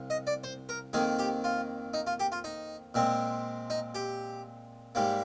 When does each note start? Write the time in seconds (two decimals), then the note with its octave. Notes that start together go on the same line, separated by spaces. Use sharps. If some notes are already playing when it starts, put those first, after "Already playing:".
Already playing: C2 F3
0.10 D#5
0.27 D5
0.44 C5
0.69 A#4
0.93 F2 D#3 A#3 G#4
1.19 G4
1.44 F4
1.94 D#4
2.07 F4
2.20 G4
2.32 F4
2.44 D#4
2.94 A#2 G#3 C4
3.70 D#4
3.95 G4
4.95 G#2 G3 A#3